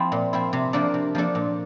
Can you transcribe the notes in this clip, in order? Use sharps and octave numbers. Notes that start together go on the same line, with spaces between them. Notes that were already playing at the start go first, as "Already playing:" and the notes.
Already playing: F3 C4 E4
A#2
F3 C4 E4
C3
F3 A#3 D4 A4
C3
F3 A#3 D4 A4
A#2